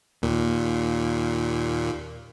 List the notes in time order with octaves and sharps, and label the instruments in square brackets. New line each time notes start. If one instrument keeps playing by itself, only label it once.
[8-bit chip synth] D#2 A#2